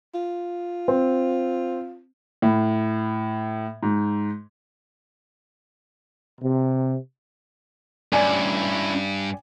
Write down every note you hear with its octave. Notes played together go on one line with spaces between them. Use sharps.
F4
C4
A2
G#2
C3
G2 C#4 E4 D5 G#5